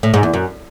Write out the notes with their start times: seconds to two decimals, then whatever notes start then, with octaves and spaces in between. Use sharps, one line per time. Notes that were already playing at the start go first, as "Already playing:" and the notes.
0.03 A2
0.14 G#2
0.23 E2
0.33 F#2